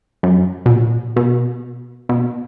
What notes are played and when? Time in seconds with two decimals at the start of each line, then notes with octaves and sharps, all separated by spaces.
0.23 F#2
0.66 B2
0.71 A#2
1.16 B2
2.09 B2